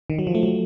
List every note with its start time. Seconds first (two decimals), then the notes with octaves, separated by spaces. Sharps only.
0.10 D#3
0.19 F#3
0.27 F3
0.35 A3
0.43 F#3